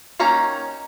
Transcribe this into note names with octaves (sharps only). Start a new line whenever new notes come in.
D#3 A#3 C#4 D#4 A#5